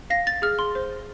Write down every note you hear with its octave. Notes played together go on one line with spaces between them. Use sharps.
F5 A#6
A6
G#4 F6
C6
C5